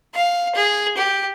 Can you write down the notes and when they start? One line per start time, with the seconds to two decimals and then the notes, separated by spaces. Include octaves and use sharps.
0.14 F5
0.55 G#4
0.97 G4